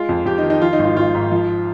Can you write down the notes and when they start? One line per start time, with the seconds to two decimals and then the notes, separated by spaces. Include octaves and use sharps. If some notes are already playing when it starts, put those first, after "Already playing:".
Already playing: G#3 F4
0.09 F2
0.25 F2 G4
0.38 D#4
0.43 D#3
0.50 D#4
0.61 F3 F4
0.73 D#4
0.79 G#1
0.84 F4
0.96 G#1 F4
1.15 G#2
1.32 F3